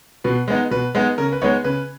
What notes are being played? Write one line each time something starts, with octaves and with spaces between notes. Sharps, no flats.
B2 B4
G#3 B3 D#4
B2 B4
G#3 B3 D#4
C#3 A#4
B4
G#3 B3 D#4 C#5
C#3 B4